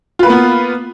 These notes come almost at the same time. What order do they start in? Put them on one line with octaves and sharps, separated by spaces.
F4 B4 A#3 B3